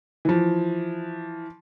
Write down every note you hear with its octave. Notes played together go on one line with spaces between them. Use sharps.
E3 F3